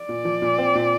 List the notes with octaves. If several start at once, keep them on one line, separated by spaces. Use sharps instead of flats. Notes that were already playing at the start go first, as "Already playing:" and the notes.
Already playing: D5
A#2
F3
A#2
C4
A#2